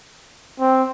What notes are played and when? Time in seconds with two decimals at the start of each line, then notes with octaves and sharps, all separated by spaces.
0.60 C4